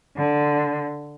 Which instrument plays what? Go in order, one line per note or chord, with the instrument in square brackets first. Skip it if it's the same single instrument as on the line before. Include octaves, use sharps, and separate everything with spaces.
[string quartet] D3